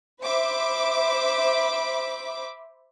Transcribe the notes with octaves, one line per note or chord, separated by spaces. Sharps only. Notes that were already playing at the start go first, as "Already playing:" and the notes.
C5 E5 B5 D6